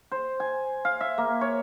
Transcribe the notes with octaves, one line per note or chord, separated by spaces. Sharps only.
C5
G#5
F5
E5
A#3
C#5